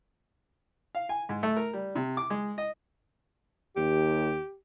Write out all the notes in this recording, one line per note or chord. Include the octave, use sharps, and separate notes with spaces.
F5
G#5
G#2
A3
A#4
G3
C3
D6
G#3
D#5
D#2 G4